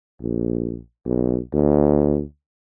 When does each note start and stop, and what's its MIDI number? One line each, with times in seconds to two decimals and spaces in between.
0.22 0.79 34
1.05 1.39 35
1.53 2.22 38